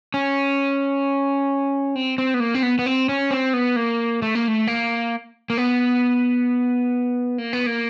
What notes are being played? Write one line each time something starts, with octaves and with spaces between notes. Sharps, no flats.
C#4
C4
C4
B3
A#3
C4
B3
B3
C4
C#4
C4
B3
A#3
A3
A#3
A3
A#3
A#3
B3
A#3
B3
A#3